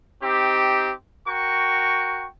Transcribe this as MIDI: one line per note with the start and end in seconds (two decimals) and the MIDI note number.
0.22 0.91 60
0.22 0.91 63
0.22 0.91 67
1.27 2.26 66
1.27 2.26 70
1.27 2.26 79
1.27 2.26 85